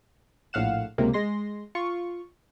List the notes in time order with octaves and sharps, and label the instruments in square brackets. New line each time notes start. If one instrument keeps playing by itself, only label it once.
[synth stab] A#1 A2 F5 F#5 E7
C#2 C3 A#3
G#3 C6 A#6
F4 C#6